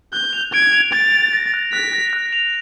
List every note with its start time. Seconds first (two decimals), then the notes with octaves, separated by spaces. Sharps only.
0.13 F#6 G6
0.33 F7
0.53 G#6 D7
0.73 F7
0.93 A6 D7
1.12 D7
1.33 A#6
1.54 F#6
1.73 F#6 B6
1.93 A#6
2.13 F#6
2.33 F7